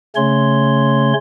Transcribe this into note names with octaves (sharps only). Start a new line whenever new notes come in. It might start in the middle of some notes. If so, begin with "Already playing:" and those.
C#3 A3 C#4 C#5 C6